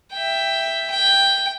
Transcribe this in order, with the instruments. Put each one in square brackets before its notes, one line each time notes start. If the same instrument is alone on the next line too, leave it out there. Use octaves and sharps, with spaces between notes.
[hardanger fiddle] E5 G5
G5